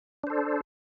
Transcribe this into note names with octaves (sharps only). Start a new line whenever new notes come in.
D4 A4 C5